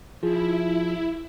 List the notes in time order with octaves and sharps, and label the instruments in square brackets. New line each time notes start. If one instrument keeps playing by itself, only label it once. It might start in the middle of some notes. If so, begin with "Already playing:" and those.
[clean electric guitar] F3 [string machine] E4 [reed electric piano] F4 G#4